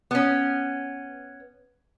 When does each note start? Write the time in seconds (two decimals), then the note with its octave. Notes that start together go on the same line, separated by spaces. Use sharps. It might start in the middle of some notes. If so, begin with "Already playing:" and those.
0.11 B3 C#4